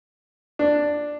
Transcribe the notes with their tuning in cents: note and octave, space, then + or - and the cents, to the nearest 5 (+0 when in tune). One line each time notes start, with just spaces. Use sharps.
D4 +5